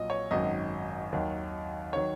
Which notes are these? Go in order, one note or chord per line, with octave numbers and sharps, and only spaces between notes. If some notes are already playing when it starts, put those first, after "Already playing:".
Already playing: A#1 A#2 F#3 D#5
C#5
G#1 F#2 D#3 F#3 D#5
D#2 D#3 F#3
D#3 F#3 C#5